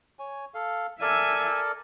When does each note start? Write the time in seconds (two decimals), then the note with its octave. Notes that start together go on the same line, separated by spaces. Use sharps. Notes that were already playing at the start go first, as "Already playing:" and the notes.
0.19 C#5 G#5
0.54 A4 F5
1.01 A4 A#4 D5 E5 G#5